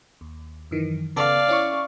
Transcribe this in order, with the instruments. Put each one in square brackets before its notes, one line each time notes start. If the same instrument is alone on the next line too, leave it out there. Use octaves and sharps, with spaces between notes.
[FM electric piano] D#2
F#2 D#3 E3
[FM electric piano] C#3 B3 A4 [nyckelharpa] D5 F5
[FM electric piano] C#4 E4 C#6